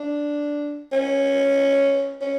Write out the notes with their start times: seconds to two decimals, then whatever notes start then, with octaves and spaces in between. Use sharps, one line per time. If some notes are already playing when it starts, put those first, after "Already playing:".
Already playing: D4
0.93 C#4
2.21 C#4